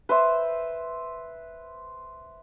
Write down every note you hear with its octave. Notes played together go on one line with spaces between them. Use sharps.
B4 C5 E5